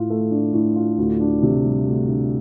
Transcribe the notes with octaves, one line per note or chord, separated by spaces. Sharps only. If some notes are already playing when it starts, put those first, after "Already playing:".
Already playing: A2 F4
A3
D4
A2
F4
D2
D4
C3
G3
D2
D4